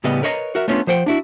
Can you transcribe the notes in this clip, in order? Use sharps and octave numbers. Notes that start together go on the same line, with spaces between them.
A2 C#3 G3 B3 B4 D#5
A#4 B4 C#5 D#5 G5 A#5
F#4 A#4 E5
A3 B3 C#4 D4 F4
F3 C5 F#5 G5
D4 E4 F#4